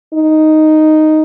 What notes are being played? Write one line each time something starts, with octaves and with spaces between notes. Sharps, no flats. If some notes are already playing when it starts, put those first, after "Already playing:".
D#4